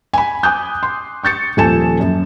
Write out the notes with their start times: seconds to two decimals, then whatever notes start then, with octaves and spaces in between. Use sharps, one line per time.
0.13 G#5 B5
0.43 G#5 D6 D#6 F#6 G6
0.83 C6
1.24 C#6 G6 A6 C#7
1.57 D#1 F3 A4 G#5 A5 E7
2.00 F#2